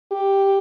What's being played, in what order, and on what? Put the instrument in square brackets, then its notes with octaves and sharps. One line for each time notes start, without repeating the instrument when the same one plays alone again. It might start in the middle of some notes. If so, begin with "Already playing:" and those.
[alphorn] G4